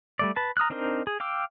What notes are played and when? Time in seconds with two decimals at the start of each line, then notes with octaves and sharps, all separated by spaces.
0.19 G3 A3 D5
0.36 B4 A5
0.57 A#5 D#6 F6 F#6
0.70 C4 D4 D#4 A#4 C5
1.07 G#4
1.20 F5 G5 D6 E6